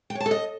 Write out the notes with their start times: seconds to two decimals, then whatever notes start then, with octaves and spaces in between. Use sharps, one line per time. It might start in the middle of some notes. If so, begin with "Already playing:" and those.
0.10 G5
0.15 C#5
0.20 A5
0.26 A4
0.31 D#5